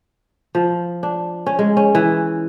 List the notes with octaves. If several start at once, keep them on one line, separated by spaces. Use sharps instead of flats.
F3
D4
C#4
G#3
C#4
E3